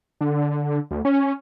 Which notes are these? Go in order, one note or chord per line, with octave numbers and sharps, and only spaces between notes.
D3
D2
C#4